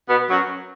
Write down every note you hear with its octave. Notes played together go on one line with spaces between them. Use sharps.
B2 B3
F#2 F#3